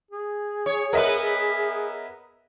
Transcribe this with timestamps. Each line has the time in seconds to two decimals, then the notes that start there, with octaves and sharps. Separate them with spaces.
0.11 G#4
0.66 C#5
0.93 B3 A#4 B4 D#5 E5